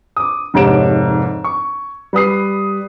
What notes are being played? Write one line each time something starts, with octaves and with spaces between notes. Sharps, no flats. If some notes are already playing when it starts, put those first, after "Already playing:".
D6 D#6
F1 G#2 G4 C#5 D7 E7
C#6
G3 B4 D#6 C7